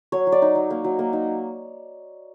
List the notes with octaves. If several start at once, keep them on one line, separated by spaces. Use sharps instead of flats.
F#3 C#5
F#3
D5
D#4
F#3
A#3
F#3
A#3
D#4